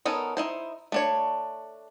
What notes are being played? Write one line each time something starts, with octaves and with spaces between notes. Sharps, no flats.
B3 C#4 D#4 A4 A#4
D#4 E4 C5
A3 D4 C#5